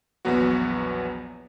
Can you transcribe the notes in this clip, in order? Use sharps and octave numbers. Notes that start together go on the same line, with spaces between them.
A#1 E2 F#3 B3 F#4